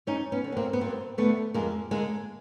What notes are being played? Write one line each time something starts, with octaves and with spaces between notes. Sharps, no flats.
G2 C#4 D#4
B3 C#4
D3
B3
A#3 C4
B3
G2 A#3 C4
D3 A3 B3
F2 G#3 A#3
D3 G#3 A#3